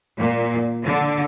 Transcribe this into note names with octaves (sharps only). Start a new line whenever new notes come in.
A#2
D3